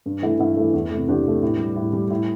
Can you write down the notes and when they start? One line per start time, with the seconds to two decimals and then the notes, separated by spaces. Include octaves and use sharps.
0.06 G2
0.22 E3 A3 E4
0.39 G2 E4
0.57 E3 A3
0.74 E2
0.91 C3 A3
1.08 E2 D4 G4
1.25 C3 A3
1.43 A2
1.59 G3
1.76 A2
1.93 G3
2.10 A2